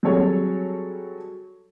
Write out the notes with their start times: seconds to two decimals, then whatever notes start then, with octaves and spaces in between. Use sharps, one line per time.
0.03 F#3 G3 C4 G#4 A4 C#5